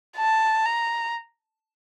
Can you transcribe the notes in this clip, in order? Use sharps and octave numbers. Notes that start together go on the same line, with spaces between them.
A5
A#5